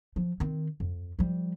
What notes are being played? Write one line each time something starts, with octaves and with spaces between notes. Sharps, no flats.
F3
D#3 C4
F2
F3 G3